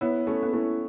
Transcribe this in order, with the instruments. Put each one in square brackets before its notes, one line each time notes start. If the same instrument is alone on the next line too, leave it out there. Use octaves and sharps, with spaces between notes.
[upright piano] B3 E4 [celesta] C#5
[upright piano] A3 C#4 [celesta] A4
[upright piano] B3
[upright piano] A3 C#4 [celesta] E4